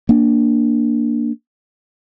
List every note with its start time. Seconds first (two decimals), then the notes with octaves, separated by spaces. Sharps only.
0.09 A#3 D4